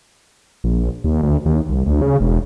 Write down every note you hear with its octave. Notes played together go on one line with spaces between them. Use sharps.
A#1
D#2
D2
D#2
C2
D2
C#3
E1